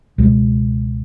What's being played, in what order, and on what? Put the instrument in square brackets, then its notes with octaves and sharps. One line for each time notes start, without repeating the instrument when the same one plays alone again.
[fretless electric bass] C#2 B2 G#3